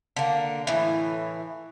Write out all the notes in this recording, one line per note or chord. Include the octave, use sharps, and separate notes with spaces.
D3 A#3
A2 E3